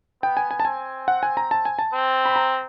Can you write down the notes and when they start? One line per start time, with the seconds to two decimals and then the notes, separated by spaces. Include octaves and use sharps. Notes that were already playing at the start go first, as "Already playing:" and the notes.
0.22 B3 G5
0.37 G#5
0.51 G#5
0.60 A5
0.65 C4 G#5
1.08 F#5
1.23 G#5
1.37 A#5
1.51 A5
1.65 G#5
1.79 A5
1.93 C4
2.25 B5
2.36 A#5